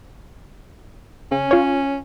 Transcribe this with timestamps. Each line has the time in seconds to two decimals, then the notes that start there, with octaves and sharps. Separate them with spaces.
1.32 C#3 C#4
1.51 F4 C#5